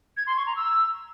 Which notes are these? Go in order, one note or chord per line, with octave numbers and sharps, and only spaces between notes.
G#6
C6
C#6
A#5
E6